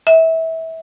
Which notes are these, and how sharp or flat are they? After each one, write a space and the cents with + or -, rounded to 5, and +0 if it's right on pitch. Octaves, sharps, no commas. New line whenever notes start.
E5 -25